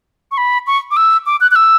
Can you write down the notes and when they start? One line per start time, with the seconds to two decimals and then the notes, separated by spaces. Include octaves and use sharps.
0.32 C#6
0.38 B5
0.67 C#6
0.91 D6
0.97 E6
1.26 D6
1.41 F#6
1.51 F#6
1.56 E6